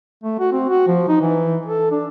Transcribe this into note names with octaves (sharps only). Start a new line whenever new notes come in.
A3
F#4
C4
F#4
F3
D#4
E3
A4
D4